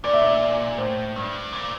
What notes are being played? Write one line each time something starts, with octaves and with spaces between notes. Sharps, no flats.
A#2 D5
E5
D5
A2 C5
G2
A#2